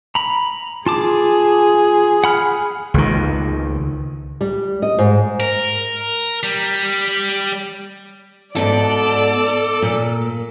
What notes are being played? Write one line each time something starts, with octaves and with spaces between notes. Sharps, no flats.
A#5 B5
F4 G#4 A5 D6
F#5 B5 F6
C#2 D#3
G3
D#5
G#2
A#4
G3
G#2 B2 A4 D5
A#2